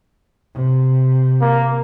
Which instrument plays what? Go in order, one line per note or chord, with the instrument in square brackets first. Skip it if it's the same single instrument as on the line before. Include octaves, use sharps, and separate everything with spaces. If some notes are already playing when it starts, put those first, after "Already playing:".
[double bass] C3
[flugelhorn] A#3